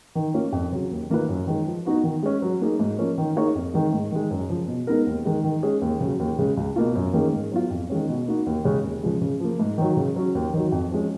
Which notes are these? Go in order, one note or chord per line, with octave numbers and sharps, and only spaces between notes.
D#3
A#3 C#4 F4
F2
C#3 F#3
D#2
D#3 A#3 F4 B4
F#2
D#3 G#3
F3
B3 D#4 F#4 B4
D#3
G#3 C#4
F#3
A#3 D#4 G#4
G#2
F3 A#3 C#4
D#3
A#3 D#4 G#4 C#5
F2
D#3 G#3
G#2
D#3 G#3
F#2
C#3 F3
B2
G#3 B3 D#4 A#4
D#2
D#3 G#3
D#3
G#3 C#4 G#4
D#2
C#3 F#3
D#2
C#3 G#3
C#2
B2 A#3 F4
F#2
D#3 A#3 C#4 G#4
G#2
F#3 B3 F4
F2
D#3 G#3 C#4
B2
A#3 D#4 F#4
D#2
C#3 G#3 C#4
D#2
C#3 F3 G#3
C#3
F3 A#3
G#2
D#3 F#3
C#3
F#3 C#4
D#2
D#3 F#3
F2
F3 G#3 C#4